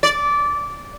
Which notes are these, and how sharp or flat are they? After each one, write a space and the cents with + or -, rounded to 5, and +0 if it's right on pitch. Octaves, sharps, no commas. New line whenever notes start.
D5 -15